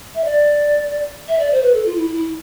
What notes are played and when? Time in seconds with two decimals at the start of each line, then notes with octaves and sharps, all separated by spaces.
0.15 E5
0.25 D5
1.28 E5
1.39 D5
1.52 C5
1.63 B4
1.74 A4
1.86 F4
1.97 E4
2.15 E4